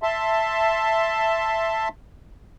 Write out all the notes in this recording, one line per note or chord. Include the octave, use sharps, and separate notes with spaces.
E5 A5 C6